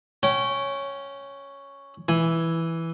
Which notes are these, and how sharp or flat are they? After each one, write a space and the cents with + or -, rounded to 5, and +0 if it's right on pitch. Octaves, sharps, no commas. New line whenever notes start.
C#4 +0 G5 -30
E3 +0 G#5 +0